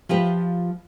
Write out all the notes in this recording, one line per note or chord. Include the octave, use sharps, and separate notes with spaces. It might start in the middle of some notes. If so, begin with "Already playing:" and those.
F3 F4 G4 B4